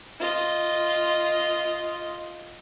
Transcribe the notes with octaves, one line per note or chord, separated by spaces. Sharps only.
F4 D#5